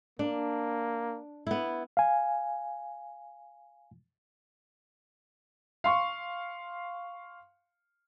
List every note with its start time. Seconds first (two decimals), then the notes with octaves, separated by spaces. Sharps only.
0.19 A#3 D4
1.47 B3 E4
1.97 F5 G#5
5.84 F5 C6 C#6